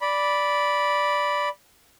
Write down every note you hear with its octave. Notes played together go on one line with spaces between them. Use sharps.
D5 B5